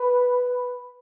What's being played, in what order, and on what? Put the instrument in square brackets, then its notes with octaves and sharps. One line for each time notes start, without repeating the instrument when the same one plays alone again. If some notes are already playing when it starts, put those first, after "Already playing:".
Already playing: [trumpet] B4